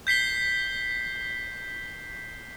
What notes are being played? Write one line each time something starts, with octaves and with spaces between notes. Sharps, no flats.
G6 B6 C7 G7